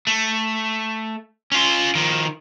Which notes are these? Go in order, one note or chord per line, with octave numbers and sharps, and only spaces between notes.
A3
C#4 F4
D#3 F3